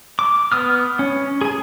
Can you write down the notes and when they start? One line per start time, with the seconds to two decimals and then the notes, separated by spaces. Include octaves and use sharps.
0.19 D6
0.52 B3 D#6 F6
0.99 C#4
1.41 G#4 G#5